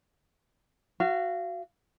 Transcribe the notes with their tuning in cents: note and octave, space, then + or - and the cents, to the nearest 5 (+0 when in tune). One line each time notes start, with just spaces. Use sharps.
F#4 +0 F5 -30